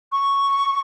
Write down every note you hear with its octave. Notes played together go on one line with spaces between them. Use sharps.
C#6